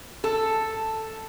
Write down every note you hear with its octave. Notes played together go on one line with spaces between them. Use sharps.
A4